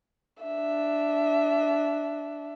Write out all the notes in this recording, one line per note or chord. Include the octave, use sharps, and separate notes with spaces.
D4 E5